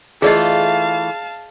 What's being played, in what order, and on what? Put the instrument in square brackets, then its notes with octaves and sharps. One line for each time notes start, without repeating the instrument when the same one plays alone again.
[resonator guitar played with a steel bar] E3 A3 F4 [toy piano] G#4 D5 D#5 [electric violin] F5 A5